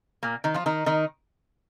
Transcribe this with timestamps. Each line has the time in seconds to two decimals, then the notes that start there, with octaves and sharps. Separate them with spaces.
0.23 A#2 A#3
0.44 D#3 D#4
0.54 F3 F4
0.66 D#3 D#4
0.86 D#3 D#4